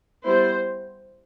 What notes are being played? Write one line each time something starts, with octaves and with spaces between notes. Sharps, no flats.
G3 B3 E4 C5